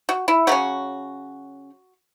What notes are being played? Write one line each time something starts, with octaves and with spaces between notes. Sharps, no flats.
F#4
E4
C#3 F#3 C#4 F#4